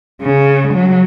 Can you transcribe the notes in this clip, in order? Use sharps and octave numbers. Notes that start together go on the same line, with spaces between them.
C#3
F#3